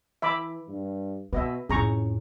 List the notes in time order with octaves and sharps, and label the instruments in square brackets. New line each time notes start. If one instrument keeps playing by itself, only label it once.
[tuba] E3 [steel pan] E5 B5 D6
[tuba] G2
[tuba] B2 [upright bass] B3 [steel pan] B4 D#5 E5
[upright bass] F2 A2 [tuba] C#4 [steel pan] G#4 A#5 C#6